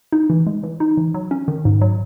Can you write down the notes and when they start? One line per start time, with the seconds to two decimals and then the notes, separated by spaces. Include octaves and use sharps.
0.12 D#4
0.30 E3
0.47 G#3
0.64 E3
0.80 D#4
0.97 E3
1.14 F#3
1.31 C#4
1.48 D#3
1.65 G#2
1.81 F#3